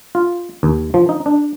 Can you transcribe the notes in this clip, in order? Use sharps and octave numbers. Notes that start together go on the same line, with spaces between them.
F4
D#2
F3
D#4
D4